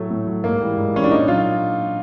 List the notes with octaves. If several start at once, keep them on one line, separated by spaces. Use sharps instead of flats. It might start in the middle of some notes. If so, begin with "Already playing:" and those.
Already playing: A2 F#3 A3
A2
F#3
G#2 A#3
E3 G3
G#2
E3 G3 C#4
D4
A#2 D#4
F#3 F4